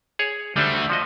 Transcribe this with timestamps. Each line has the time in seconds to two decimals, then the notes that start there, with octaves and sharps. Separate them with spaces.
0.19 G#4 C#5
0.56 D3 G3 A3 D4 C5
0.90 F3 F#4 D#5